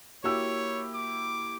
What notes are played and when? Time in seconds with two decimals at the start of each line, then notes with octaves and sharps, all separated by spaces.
0.24 A#3 E4 F#4 G4 C#5 E6
0.94 D6